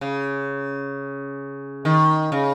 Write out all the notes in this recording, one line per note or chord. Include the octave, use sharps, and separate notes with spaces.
C#3
D#3
C#3